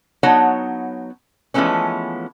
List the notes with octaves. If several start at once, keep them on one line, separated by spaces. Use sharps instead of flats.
F#3 B3 D#4 C#5 F#5 A5
E3 F3 G#3 A3 B3 C#4